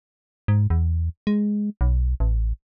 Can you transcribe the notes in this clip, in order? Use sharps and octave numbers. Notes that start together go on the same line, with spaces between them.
G#2
E2
G#3
B1
A1